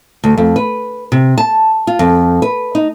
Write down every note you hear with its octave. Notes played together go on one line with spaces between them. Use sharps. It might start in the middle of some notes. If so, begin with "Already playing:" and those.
D2
F2
B4
C3
A5
F4
F2
B4
D#4